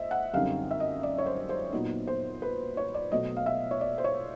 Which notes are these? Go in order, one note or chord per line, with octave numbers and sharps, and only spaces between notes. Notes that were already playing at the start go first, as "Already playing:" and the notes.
Already playing: C5 D#5 E5
F#5
F#2 D3 G3 C4 D#4 F5
E5
D#5
D5
C#5
C5
C5
A#2 F#3 B3 D#4
C5
B4
C#5
D5
B2 F#3 A3 D#5
F5
E5
C#5
D5
C5
C#5